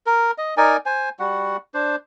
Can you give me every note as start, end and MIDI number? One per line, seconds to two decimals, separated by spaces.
0.06 0.31 70
0.38 0.55 75
0.57 0.77 63
0.57 0.77 70
0.57 0.77 74
0.57 0.77 80
0.86 1.09 72
0.86 1.09 80
1.19 1.57 55
1.19 1.57 66
1.19 1.57 78
1.74 1.96 62
1.74 1.96 72